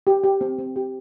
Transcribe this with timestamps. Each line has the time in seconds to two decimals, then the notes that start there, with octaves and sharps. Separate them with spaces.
0.07 G4
0.24 G4
0.41 C4
0.59 C4
0.76 G4